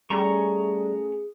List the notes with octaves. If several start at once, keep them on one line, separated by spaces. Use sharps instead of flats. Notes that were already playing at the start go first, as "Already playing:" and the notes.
G3 A3 C#4 G#4 A#5 C#6